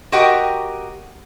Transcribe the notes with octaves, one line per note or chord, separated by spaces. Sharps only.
F#4 G4 A#4 D#5 F#5 G5